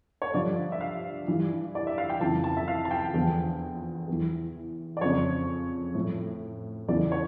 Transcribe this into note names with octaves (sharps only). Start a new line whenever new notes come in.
C#5
G2 D3 F3 D5
E5
F5
G2 E3
D5
E5
F5
G5
F2 C#3 E3 A5
A5
E5
F5
A5
G5
E2 D3 F3
E2 E3
D5
F2 C#3 F3 C#5
A2 F3
E2 C#3 E3 D5
C#5